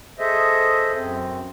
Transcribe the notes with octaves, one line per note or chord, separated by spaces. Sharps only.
G#4 A4 C5 D#5 E5
F#2 C4